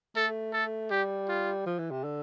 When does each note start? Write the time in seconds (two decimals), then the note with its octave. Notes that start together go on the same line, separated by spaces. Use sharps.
0.16 A3 A4
0.53 A4
0.91 G3 G4
1.29 F4
1.66 F3
1.79 E3
1.91 C3
2.04 D3